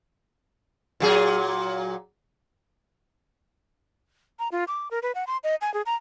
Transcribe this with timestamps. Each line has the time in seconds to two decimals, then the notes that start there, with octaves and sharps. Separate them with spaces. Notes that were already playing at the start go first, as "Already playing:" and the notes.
1.00 A#2 F#3 G#4
4.39 A#5
4.52 F4
4.68 D6
4.91 A#4
5.02 B4
5.15 F#5
5.27 C6
5.44 D#5
5.61 G#5
5.74 G#4
5.86 A#5